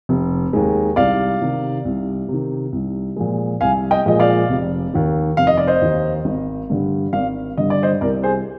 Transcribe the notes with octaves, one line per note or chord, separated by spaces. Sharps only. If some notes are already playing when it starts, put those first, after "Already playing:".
F1
D#2 D#3 G#3
C2 D5 F5
C3 D#3
C2
C3 D#3
C2
A#2 F3 G#3
C2 F5 G#5
D#5 G5
A#2 F3 G#3 D#5
D5 F5
F1
D#2 D#3
F1 F5
D#5
D5
C5 D#5
D#2 D#3
G#1
G2 D3 G3
G#1 D5 F5
G2 D3 G3 D#5
D5
C5 D#5
C2 A#4 D5
G#4 C5